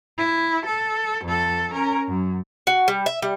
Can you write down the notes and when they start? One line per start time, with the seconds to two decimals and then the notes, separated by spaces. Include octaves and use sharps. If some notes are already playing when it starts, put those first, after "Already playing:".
0.18 E4
0.66 A4
1.25 F2 A4
1.72 C#4 A#4
2.08 F#2
2.67 F#4
2.88 G3
3.06 E5
3.22 G3